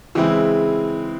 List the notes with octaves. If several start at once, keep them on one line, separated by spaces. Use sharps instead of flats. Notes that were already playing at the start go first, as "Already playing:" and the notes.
C#3 E3 G#3 C4 E4